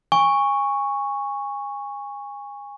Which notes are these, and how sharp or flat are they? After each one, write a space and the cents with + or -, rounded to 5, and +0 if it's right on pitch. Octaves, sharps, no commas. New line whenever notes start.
G#5 -25 C#6 +0